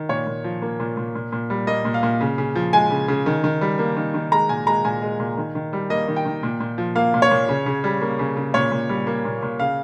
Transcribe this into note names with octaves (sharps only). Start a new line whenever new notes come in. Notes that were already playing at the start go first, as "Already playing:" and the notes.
Already playing: D#3
A#2 C#5
A#2
F3
A#3
A#2
A#2
A#2
A#2
G3
A#3 D#5
A#2
F5
A#2
C#3
C#3
F3
G#3 G#5
C#3
C#3
D#3
D#3
G3
A#3
D#3
D#3
G#3 A#5
A#2 G#5
G#3 A#5
A#2 G#5
G#3
A#2
D#3
D#3
G3
A#3 D#5
D#3
G5
D#3
A#2
A#2
F3
A#3 F5
A#2
C#5
A#2
C#3
C#3
G3
A#3
C#3
C#3
A#2 C#5
A#2
G3
A#3
A#2
A#2
C#3 F5